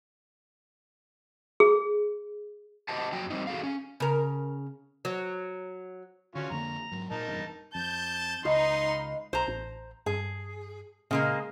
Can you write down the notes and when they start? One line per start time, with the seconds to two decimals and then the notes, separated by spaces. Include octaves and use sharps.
1.60 G#4
2.89 G4 C5 D#5 F#5 A5
3.12 F2 F#3 G5
3.30 G3 C4 D#4
3.47 F#4 G#4 A4 F5
3.63 C#4
4.00 C#3 A#4
5.05 F#3
6.35 D3 C#4 F4 F#4
6.50 F2 D3 A#3 A#5
6.92 G#2 F#3
7.11 A#2 D#4 A#4 A5
7.27 F1 E2 G2
7.75 F2 A5 G6
8.45 C#2 D#4 B4 D#5 F5 C6
9.33 B1 C5 A#5
9.48 A1
10.06 G2 G#4
11.11 A#2 C#3 G#3 A#3